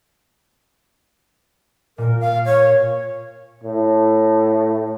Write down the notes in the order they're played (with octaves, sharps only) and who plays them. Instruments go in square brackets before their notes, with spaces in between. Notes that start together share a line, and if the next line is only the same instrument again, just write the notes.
[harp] A#2 [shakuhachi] A#4
[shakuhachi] F5
C#5
[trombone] A2